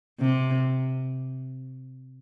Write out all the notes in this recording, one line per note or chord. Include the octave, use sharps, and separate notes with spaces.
C3